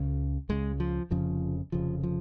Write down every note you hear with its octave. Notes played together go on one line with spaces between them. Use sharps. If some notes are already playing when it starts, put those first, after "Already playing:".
Already playing: C#2 C#3
C#2 C#3 G#3
F3
F1 F2 C#3 F3
F1 F2 C#3 F3
F3